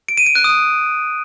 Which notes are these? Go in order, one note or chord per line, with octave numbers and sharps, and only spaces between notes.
D7
D#7
D7
F#6
D#6